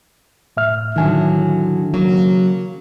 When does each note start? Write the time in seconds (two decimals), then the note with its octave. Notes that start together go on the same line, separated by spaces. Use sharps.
0.57 A2 E5 F6
0.96 A2 D3 D#3 F#3 G#5
1.94 C#3 F#3 A#3